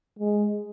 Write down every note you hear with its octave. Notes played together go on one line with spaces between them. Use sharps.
G#3